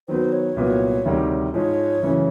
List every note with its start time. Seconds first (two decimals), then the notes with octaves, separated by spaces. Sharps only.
0.08 D#3 F#3 B3 C5
0.32 C#5
0.56 C2 A#2 F#3 B3
1.05 D2 C3 D#3 G3
1.54 G#2 F3 G#3 C#5
2.02 F#2 C#3 E3 A3 C#4